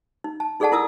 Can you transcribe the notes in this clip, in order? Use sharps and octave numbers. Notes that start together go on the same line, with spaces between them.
D#4
A5
D#4 G#4 A4 D5 F#5 A5
E4 A#4 D#6 E6